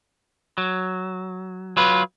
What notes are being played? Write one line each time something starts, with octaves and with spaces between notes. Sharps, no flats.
F#3
F#3 F4 B4